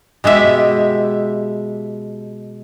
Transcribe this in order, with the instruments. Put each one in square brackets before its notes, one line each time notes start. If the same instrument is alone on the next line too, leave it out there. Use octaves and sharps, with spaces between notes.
[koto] B2 G#3 G4 E5